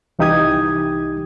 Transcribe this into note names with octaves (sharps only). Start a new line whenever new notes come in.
C2 E3 D#4 G4 D#6 G#6